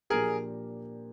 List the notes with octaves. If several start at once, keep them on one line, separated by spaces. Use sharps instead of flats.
A#2 F3 A#3 D4 G4 G#4 A#4